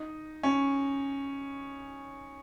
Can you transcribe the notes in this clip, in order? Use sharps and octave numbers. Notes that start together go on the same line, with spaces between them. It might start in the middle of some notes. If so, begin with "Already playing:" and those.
Already playing: D#4
C#4